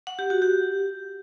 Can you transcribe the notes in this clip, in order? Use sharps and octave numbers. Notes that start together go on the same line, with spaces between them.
F#5
G4
F#4
G4